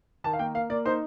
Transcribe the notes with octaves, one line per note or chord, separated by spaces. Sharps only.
D#3 A5
F5
A#3 G5
A#3 F5
A#3 D5
D#4 C5